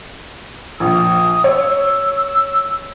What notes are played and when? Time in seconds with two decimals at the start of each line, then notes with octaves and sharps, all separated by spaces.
0.80 A#1 D#6
1.44 C#5 E6